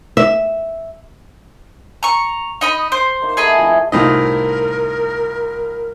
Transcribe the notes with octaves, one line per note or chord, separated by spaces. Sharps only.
E5
A#5 C#6
D#4 D#5 B5
C5
A#3 D#4
A3 G#4 D#5 F#5 B5
F3 C4 E4
C2 A2 D#4 F4 A#4 D#5